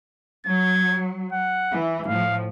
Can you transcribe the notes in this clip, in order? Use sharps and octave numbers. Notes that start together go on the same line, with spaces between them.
F#3 G#6
F#5
E3
A2 F3 F5